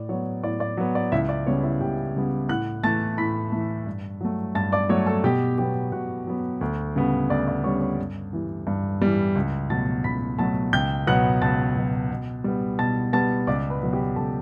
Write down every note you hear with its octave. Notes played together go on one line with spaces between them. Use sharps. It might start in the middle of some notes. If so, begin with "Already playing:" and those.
Already playing: A2 D5
F#3 B3 C#5
A2 D5
D5
F#3 B3
D5
C#2 E4 E5
D5
C#3 G3 B3 C#5
E4 E5
C#2 G4 G5
C#3 G3 B3
A2 F#5 F#6
E3 A3 A5 A6
A2 B5 B6
E3 A3
G2
F#3 A3
G2 A5 A6
D5 D6
F#3 A3 C#5 C#6
A4 A5
B2 G4 G5
F#3 B3 G4 G5
B2 F#4 F#5
F#3 B3
D2
C#3 G3 B3
D2 D5
D5
C#3 G3 B3 C#5 C#6
C#5 C#6
G2
E3 G3
G2
E3 G3
C#2
B2 F#3 A3 A5 A6
C#2 B5 B6
B2 F#3 A3 A5 A6
C#2 G5 G6
B2 F#3 B3 F#5 F#6
C#2 A5 A6
B2 F#3 B3
B2
G3 B3
B2 A5 A6
G3 B3 A5 A6
C#2 D5 D6
B4 B5
B2 F#3 B3
G4 G5
C#2 A4 A5